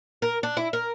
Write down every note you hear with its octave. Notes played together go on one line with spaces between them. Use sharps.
A#4
D4
E4
A#4